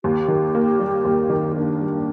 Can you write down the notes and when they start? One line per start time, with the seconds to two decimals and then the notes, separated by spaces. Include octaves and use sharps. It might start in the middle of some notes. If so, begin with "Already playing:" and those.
0.04 D#2 G4
0.28 D#3
0.55 A#3
0.80 G3
1.05 D#2
1.30 D#3
1.55 A#3 D4
1.81 G3